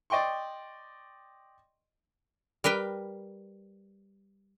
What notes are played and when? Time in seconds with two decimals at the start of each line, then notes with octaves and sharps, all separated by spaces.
0.10 D5 D#5 G5 C6 C#6
2.64 G3 A#4 B4 G5